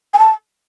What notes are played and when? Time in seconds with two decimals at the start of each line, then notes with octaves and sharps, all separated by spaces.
0.13 G#5
0.18 A5